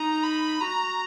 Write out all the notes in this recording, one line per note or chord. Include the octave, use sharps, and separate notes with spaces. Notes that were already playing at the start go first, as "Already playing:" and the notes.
Already playing: D#4 A#5
B5
F#4 A#5